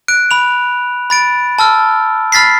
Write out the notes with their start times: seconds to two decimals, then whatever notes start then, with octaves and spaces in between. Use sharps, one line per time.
0.08 F#6 D7
0.31 B5 F7
1.10 B5 A6 D7
1.59 A5 E6 F6
2.32 B5 F6 A6 B6 C7